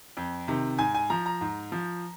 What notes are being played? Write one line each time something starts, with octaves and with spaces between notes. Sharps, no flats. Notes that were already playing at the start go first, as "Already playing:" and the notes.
F2
C3 D#3
G#2 G#5
G#5
F3 A#5
A#5
G#2
F3